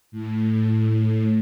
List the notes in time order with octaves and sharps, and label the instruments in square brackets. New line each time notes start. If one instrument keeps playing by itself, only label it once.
[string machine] A2